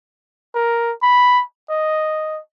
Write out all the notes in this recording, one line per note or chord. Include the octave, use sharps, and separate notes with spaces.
A#4
B5
D#5